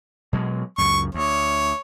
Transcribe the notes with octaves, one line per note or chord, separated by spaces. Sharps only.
B2 F#3 G#3
C#2 F#2 C#6
D2 C#5